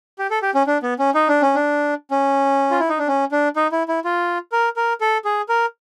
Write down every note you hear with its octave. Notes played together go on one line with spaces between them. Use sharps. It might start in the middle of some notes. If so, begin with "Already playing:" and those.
G4
A4
G4
C#4
D4
B3
C#4
D#4
D4
C#4
D4
C#4
F4
E4
D#4
D4
C#4
D4
D#4
E4
E4
F4
A#4
A#4
A4
G#4
A#4